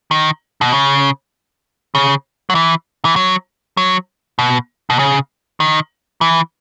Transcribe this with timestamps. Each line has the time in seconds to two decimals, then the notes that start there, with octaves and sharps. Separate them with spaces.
0.11 D#3
0.61 B2
0.72 C#3
1.95 C#3
2.50 F#3
2.55 E3
3.05 E3
3.16 F#3
3.77 F#3
4.39 B2
4.90 B2
4.99 C#3
5.60 D#3
6.21 E3